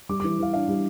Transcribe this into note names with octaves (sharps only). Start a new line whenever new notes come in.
G3 D6
E3 D6
E3 F5
D4 F5
G3